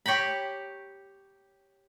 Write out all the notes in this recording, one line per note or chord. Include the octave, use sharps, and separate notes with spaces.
G4 C#5 G5 A#5 B5